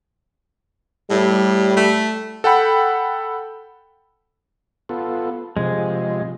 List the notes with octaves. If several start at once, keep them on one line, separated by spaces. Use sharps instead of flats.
A2 G3
A3
A4 F#5 G5 B5
B3 F4 A4
C3 F3 G#3 G#4